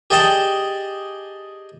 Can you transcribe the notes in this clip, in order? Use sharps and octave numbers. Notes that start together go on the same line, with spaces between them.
G4 G#4 D5 D#5 G5 A5